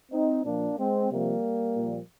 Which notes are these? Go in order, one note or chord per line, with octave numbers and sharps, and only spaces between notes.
C4 D#4
A#2 F3 A#3 D4
G#3 C4
C3 F3 G3 A#3
A#2 F3